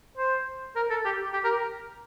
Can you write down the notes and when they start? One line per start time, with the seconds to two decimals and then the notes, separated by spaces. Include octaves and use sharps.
0.18 C5
0.76 A#4
0.91 A4
1.05 G4
1.34 G4
1.44 A#4